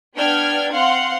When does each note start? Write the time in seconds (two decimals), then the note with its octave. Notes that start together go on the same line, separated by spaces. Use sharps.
0.16 B3 D4 G5 F6 G#6
0.72 C4 F5 F#5 C6